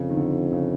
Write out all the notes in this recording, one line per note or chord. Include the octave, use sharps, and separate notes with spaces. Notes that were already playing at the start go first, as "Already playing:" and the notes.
Already playing: F2 C#3
D#3
D3
C#3